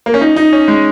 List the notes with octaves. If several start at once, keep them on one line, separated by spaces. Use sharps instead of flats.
A#3
C#4
D#4
D#4
C#4
G#3